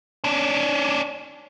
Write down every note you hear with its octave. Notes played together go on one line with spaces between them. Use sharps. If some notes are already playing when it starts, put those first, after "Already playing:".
C#4 D4